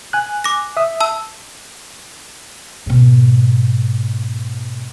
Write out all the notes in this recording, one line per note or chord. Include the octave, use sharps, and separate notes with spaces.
G#5 F#6
D6 A#6
E5 D#6
A5 E6
G#2 B2